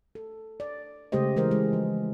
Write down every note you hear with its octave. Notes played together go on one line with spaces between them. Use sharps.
A4
D5
C#3 G#3 A3 G4 C5 D#5
E3 G#3 A#4 C5 D#5
G#3
F3